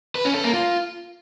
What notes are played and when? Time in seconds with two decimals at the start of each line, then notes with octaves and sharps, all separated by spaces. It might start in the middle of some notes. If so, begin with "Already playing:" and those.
0.15 B4
0.25 C#4
0.34 A4
0.44 A#3
0.53 F4